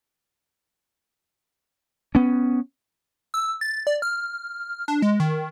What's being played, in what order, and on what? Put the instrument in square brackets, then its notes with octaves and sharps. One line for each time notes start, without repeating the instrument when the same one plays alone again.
[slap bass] B3 C#4
[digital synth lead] E6
A6
D5
F6
D4
G#3
D#3